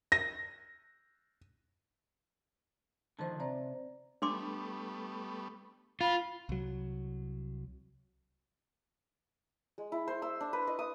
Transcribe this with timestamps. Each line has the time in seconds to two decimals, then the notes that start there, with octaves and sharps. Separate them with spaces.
0.12 A#6
3.19 D3 D#3 F3 C5 A5
3.40 C3 C5 D5 A#5
4.22 G3 A3 B3 D4 C6 D6
6.01 F4 B5
6.49 C2 F#3
9.78 G#3
9.92 E4
10.08 C5
10.22 E6
10.40 D4
10.53 B4
10.67 D#5
10.79 D#6